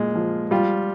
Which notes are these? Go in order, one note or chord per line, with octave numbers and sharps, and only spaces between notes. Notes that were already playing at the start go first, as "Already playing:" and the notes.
Already playing: A#2 G#3
F3
G3 F4